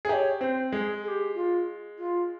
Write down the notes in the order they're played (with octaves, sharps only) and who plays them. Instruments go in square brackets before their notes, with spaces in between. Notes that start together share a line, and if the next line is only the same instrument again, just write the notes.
[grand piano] G#4
[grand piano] G4 [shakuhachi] C#5 E5
[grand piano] C4 [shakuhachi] C5
[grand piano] G#3 [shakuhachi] G#4
[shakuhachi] G#4
G4
F4
F4